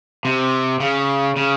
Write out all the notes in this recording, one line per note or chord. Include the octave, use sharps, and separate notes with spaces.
C3
C#3
C#3